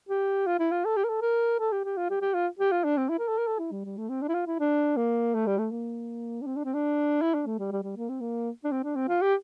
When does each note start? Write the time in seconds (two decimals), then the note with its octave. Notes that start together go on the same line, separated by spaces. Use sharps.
0.09 G4
0.47 F4
0.59 E4
0.71 F4
0.85 A4
0.96 G4
1.04 A#4
1.09 A4
1.21 A#4
1.59 A4
1.72 G4
1.84 G4
1.97 F4
2.10 G4
2.21 G4
2.34 F4
2.59 G4
2.71 F4
2.84 D4
2.97 C4
3.09 E4
3.19 A#4
3.28 A4
3.38 A#4
3.47 A4
3.59 E4
3.72 G3
3.85 G3
3.97 A3
4.09 C4
4.22 D4
4.28 E4
4.34 F4
4.47 E4
4.59 D4
4.97 A#3
5.34 A3
5.46 G3
5.58 A3
5.71 A#3
6.41 D4
6.46 C4
6.56 D4
6.64 C4
6.74 D4
7.21 E4
7.34 D4
7.46 A3
7.58 G3
7.72 G3
7.83 G3
7.97 A#3
8.09 C4
8.20 A#3
8.64 D4
8.72 C4
8.84 D4
8.95 C4
9.08 F4
9.21 G4